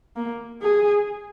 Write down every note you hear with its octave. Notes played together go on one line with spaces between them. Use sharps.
A#3
G#4